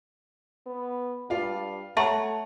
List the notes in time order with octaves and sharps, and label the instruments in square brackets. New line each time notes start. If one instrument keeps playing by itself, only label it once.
[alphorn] B3
[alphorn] G2 [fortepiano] F4 D5 F5
[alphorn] A3 [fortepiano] C#5 F#5 A#5 [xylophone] E5 A5 C#6